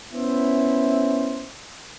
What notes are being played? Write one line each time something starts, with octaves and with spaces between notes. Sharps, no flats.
B3 C#4 E4 C5 E5